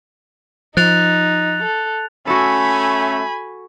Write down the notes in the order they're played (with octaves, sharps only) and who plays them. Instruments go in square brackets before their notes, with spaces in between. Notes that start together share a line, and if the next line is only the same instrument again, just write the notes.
[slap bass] F3 [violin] D#4 [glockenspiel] F#6 A6 F7
[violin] A4
[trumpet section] A3 C#4 E5 [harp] F#4 A4 [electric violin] G#5 B5